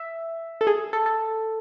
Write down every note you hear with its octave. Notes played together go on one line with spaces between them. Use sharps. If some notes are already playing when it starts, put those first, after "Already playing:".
Already playing: E5
A4
G#4
A4
A4